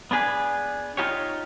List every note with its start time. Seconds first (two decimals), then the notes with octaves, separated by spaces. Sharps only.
0.11 B3 D4 G#4 B4
0.97 D#4 F4 G4 C#5